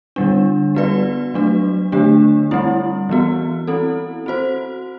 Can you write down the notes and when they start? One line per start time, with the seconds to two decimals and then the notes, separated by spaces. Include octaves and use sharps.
0.16 D3 G3 D4
0.75 G3 B3 F#4 B4 D5
1.34 F#3 A3 D4 F#4
1.92 D3 A3 D4 G4
2.51 G3 C4 E4
3.09 E3 B3 F#4
3.67 C4 E4 A4
4.26 C4 F#4 C5